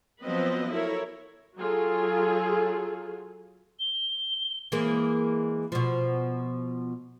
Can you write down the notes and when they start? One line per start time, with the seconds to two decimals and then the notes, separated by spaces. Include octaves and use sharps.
0.21 F3 F#3 B3 C4 B4 D#5
0.70 E4 A4 A#4 C#5
1.57 F#3 F4 G#4 A4
3.80 G7
4.72 E3 G#3 A#3
5.72 B2 F3